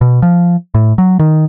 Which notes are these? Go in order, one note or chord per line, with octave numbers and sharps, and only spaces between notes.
B2
F3
A2
F#3
D#3